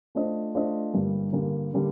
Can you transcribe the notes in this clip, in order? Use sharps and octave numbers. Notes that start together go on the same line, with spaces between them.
A3 D4 F4 C5 D#5
A3 D4 F4 C5 D#5
G2 D3 G3 A#3
G2 D3 G3 A#3
D3 G3 A#3